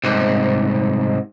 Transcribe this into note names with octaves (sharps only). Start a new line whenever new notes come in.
C2 G#2